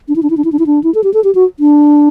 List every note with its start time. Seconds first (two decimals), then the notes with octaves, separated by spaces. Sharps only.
0.08 D4
0.16 E4
0.23 D4
0.30 E4
0.37 D4
0.45 E4
0.52 D4
0.59 E4
0.66 D4
0.84 E4
0.95 A4
1.04 G4
1.14 A4
1.24 G4
1.35 F#4
1.60 D4